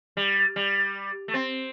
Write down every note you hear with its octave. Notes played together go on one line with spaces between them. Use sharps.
G3
G3
A3
C4